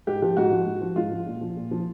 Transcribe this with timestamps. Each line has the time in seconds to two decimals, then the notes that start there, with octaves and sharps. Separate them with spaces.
0.07 G#2 G4
0.22 F3 G4
0.37 G#2 F#4
0.51 F3
0.66 G#2
0.81 F3
0.96 G#2 F4
1.11 F3
1.27 A#2
1.41 F3
1.57 A#2
1.71 F3